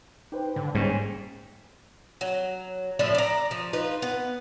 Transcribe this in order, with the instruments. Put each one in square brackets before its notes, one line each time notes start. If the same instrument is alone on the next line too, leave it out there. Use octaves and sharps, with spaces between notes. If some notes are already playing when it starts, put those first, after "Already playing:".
[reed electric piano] D#4 B4 C5 [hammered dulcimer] G4
[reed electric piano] G#2 [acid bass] D3 [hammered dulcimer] B5
[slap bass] G#2 [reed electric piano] G3 A#3 [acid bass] C#4
[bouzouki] F#3
A2 F3 D4 E5
D5 A#5
F3
D#4 F4 B4
B3